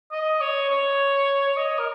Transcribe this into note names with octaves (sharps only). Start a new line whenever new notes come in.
D#5
C#5
C#5
C#5
D#5
A#4